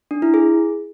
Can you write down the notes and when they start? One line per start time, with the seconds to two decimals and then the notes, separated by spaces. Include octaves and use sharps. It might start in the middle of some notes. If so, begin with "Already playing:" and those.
0.11 D4
0.22 E4
0.34 G#4